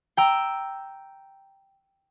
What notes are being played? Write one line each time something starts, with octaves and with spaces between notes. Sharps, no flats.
G5 A#5 E6